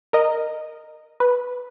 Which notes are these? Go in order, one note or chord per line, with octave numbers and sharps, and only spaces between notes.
A#4 D#5
B4